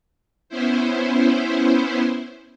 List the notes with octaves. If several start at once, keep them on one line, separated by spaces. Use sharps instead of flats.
B3 C#4 E4 C5